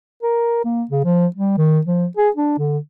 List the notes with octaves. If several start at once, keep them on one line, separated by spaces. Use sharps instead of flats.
A#4
A#3
C#3
F3
G3
D#3
F3
G#4
D4
D3